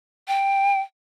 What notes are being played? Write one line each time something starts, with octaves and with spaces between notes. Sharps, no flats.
G5